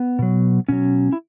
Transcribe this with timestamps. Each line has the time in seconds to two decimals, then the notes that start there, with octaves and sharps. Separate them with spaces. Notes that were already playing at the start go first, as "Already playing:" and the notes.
Already playing: B3
0.19 B2 F#3
0.68 B2 F#3 C#4
1.13 E4